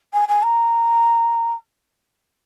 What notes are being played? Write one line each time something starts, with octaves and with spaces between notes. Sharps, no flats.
G#5
G#5
A#5